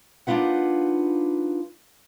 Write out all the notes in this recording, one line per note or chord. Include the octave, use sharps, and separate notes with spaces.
A#3 D4 D#4 F4 B4 F#5